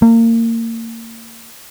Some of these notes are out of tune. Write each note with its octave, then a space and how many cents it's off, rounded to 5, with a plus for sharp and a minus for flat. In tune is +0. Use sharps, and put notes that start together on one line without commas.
A#3 -30